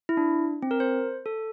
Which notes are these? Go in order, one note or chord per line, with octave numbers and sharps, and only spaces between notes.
E4
D4
C4
A#4
C5
A4